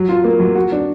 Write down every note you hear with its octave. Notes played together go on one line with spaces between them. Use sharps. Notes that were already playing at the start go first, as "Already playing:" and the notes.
Already playing: F#3
F4
A#3
F#3
F#4
D4